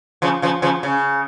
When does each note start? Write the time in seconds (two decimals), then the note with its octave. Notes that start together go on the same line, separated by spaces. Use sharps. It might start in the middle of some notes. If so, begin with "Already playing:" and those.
0.22 C#3 F3
0.42 C#3 F3
0.62 C#3 F3
0.83 C#3